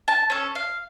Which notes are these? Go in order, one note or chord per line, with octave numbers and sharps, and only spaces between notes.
A5
C#4 A4
F5